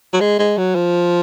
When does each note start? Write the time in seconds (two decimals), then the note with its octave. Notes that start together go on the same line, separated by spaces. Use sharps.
0.13 F#3
0.21 G#3
0.39 G#3
0.58 F#3
0.75 F3